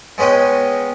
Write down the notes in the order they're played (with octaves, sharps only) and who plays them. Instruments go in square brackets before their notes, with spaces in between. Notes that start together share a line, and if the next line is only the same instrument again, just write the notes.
[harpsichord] G#3 B3 C#4 D#5 G5